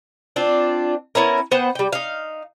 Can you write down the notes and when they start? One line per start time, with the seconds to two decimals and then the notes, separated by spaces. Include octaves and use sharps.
0.36 C4 D4 F4
1.15 B3 C#4 E4 A#4
1.51 B3 C5 F#5 G5
1.75 G3 G5
1.93 D#4 F5